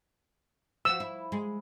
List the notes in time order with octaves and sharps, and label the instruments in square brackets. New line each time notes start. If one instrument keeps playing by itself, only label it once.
[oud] F3 F#4 [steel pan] E6
[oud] E4
G#3